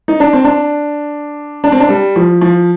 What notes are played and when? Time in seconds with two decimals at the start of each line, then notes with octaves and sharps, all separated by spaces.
0.08 D#4
0.20 D4
0.33 C4
0.44 D4
1.64 D4
1.72 C4
1.80 D4
1.89 G3
2.16 F3
2.41 F3